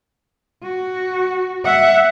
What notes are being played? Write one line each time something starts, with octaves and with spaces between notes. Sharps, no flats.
F#4
E5 F#5